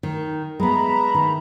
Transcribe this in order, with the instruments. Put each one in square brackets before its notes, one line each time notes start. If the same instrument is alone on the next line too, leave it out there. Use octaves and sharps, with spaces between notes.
[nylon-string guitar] D#3
[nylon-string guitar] G#3 B3 [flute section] E5 A#5 B5
[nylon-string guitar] D#3